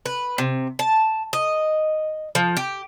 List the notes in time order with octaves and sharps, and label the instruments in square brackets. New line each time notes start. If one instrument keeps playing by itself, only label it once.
[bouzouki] B4
C3
A5
D#5
F3
G4